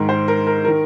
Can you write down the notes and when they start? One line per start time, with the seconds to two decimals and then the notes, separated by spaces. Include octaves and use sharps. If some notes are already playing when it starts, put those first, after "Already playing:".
Already playing: G#2 D#3 A#4
0.09 C5
0.28 A#4
0.47 A#4
0.65 D#3 A#4